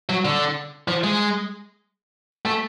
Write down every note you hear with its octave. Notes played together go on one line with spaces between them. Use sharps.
F#3
D3
F3
G#3
A3